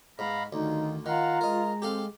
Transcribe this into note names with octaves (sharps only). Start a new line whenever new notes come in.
G#2 G#3 B3 F5 A#5 B5
D2 D#3 F#3 G3 D#4 F4
D#3 F4 F5 F#5 A#5
G#3 A#4 D#5
C4 G4 A4 F5